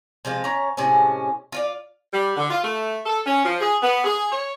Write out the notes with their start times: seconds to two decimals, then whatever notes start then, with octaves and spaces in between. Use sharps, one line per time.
0.25 C3 F3 G#3 F4
0.44 C#4 A#5
0.77 A2 C3 G#3 C#4
1.52 F4 D5 F5
2.12 G3
2.36 D3
2.50 F4
2.62 A3
3.06 A4
3.26 C#4
3.44 F3
3.60 G#4
3.82 B3
4.04 G#4
4.30 C#5